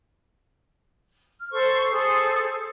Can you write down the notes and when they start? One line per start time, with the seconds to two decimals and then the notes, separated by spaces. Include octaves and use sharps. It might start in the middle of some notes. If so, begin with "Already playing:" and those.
1.40 F6
1.51 A4 C5 C#6
1.91 G#4 A4 C5